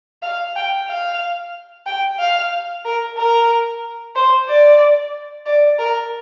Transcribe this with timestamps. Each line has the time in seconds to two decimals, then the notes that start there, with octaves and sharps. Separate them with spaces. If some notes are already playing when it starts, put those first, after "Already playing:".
0.22 F5
0.56 G5
0.88 F5
1.86 G5
2.19 F5
2.85 A#4
3.17 A#4
4.15 C5
4.48 D5
5.46 D5
5.79 A#4